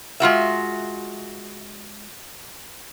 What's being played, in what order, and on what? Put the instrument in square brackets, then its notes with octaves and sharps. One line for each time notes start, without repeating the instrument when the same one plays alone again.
[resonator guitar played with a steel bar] G#3 F4 F#4 E5